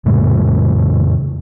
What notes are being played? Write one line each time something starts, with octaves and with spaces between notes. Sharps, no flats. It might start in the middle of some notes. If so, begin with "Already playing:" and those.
F2 A2 C#3 G#3